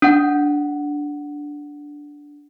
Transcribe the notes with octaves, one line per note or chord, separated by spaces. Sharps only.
D4 F#5